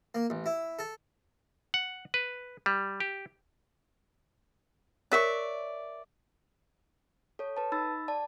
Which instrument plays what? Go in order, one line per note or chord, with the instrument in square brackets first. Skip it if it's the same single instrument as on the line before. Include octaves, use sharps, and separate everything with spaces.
[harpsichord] A#3
A1
E4
A4
[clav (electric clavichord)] F#5
B4
G3
G4
[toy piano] A#4 C#5 [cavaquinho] D5 E5 C#6
[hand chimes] A4 C#5
B4 A5
D#4 B5 E6 A6
D5 A5